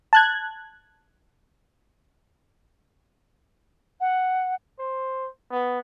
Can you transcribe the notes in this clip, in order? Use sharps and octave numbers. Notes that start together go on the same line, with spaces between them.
A5 F#6 G#6
F#5
C5
B3